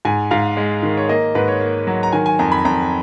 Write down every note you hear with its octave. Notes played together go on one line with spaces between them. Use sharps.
G#2 G#5
G#2 F5
G#3
D#3
C#5
A#3 D#5
G#2 B4
C#5
A#3
F#3
A#5
D#3 G#5
G#5
F2 A#5
B5
F2 A#5